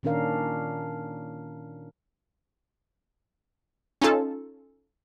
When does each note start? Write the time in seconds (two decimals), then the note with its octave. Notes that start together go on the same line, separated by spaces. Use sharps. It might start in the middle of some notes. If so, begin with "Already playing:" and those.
0.03 A#2 D#3 C#4 D4 A#4 F5
4.02 C#4 D#4 F4 A4